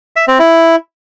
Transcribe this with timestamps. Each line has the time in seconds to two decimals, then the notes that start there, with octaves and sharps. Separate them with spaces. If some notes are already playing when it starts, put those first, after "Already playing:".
0.16 E5
0.28 C4
0.39 E4